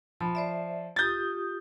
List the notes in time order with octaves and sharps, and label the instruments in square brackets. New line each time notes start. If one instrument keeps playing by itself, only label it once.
[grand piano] F3 [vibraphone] B5
[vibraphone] C5 D5 E5
[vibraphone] F4 G4 D#6 [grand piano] G6 A6